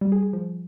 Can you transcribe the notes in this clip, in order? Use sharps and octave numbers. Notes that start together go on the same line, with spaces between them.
G3
G#4
G#4
F3